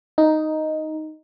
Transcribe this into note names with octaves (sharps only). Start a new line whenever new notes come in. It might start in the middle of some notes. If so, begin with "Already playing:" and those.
D#4